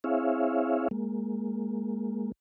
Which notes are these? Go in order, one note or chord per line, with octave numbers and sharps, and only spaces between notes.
C4 E4 G#4 C#5 E5 F5
G#3 A#3